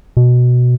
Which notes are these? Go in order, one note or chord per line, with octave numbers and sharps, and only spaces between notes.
B2